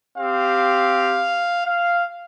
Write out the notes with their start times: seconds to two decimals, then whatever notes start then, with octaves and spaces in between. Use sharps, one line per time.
0.17 C4 G4 F5
1.65 F5